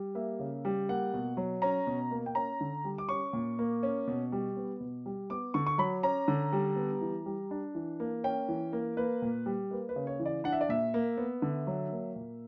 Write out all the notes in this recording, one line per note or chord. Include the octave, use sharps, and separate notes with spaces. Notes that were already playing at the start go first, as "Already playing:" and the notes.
Already playing: G3
A#3 E5
C#3
G3
A#3 F#5
B2
F#3
C#4 A#5
B2
A#3
G5
C#4 A#5
D3
G3
D6
C#4 C#6
A#2
A#3
C#4
B2
G3
B3
B2
G3
B3 D6
D3 C#6
C#6
F#3 B5
C#4 A#5
D3
G3
B3
E3
G3
D4
E3
A#3
C#4 G5
E3
A#3
A#3 B4
A#2
G3
A#3 B4
B4
C#3
C#5
E3
D5
D4 F#5
E5
D5
A#2 E5
A#3
B3
D3
F#3
A#3
A#2